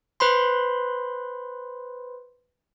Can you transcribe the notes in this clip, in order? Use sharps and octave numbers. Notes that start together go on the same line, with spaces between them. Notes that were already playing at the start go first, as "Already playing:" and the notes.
B4 C5 B5 C6